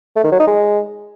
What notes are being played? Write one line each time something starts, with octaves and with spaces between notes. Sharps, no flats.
A3
D#3
F#3
D#4
G#3